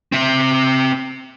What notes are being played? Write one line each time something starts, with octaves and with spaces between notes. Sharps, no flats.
C4 E5